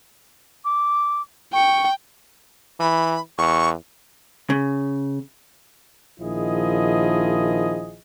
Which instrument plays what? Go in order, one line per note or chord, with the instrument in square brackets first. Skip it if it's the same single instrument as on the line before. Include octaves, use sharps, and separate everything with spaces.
[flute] D6
[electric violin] G5 [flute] C#6
[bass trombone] E3 [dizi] B5
[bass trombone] E2 [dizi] C#6
[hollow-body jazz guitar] C#3
[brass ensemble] A#1 D#3 F3 E4 G#4 D#5